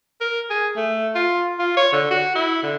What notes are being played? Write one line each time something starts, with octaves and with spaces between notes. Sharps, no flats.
A#4
G#4
A3
F4
F4
C#5
D3
F#4
E4
D3